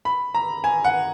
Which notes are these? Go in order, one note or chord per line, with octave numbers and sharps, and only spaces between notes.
B5
A#5
G#5
F#5